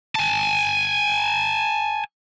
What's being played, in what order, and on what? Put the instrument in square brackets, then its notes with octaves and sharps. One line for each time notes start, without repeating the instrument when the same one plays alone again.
[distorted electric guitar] G#5 A5